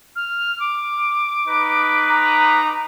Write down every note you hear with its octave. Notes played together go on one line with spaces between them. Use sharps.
F6
D6
D#4 B4
A#5